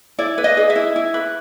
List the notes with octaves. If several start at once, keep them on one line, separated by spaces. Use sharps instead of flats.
E4 D5
B4
D#5
G#4
E5
E4
E4
B4